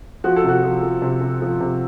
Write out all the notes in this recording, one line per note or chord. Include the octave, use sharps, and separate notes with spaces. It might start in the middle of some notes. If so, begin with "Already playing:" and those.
F3 F#4
A4
C3 F#4
F3
F3
C3
C3
F3
C3